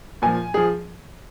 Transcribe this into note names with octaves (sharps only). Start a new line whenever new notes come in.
A#2 F3 G#5
F3 G#4